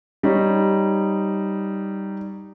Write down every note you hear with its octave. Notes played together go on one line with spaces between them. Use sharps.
G3 D#4 C#5